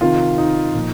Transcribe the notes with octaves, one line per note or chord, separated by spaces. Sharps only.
C3 D#3 F4
D#4
A#2 F3